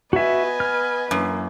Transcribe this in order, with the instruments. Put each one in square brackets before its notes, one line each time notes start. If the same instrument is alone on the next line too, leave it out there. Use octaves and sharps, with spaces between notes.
[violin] B3 B4 [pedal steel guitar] F#4 E5 [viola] D#5 G#5
[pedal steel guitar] F6
[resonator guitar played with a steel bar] F#2 [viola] E3 A#3